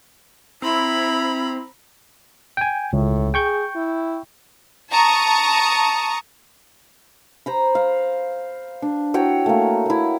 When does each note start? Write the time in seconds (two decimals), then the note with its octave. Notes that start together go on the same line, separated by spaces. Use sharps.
0.62 C4 E4 A#5 B5
2.57 G5 G#5
2.93 C#2 A2
3.34 G#4 G5 C#6 G6
3.76 E4
4.91 A5 A#5 C#6 D#6
7.46 C5 A#5 B5
7.75 F5
8.82 D4
9.14 E4 F#4 C#5 G5
9.46 A3 A#3
9.86 A#3 E4